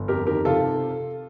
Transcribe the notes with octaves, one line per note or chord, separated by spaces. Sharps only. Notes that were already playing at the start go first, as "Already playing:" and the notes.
Already playing: G1
F2 G4 A#4
D#3 G4 A#4
C3 F4 A4